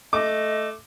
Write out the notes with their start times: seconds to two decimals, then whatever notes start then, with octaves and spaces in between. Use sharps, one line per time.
0.13 A3 D#5 D6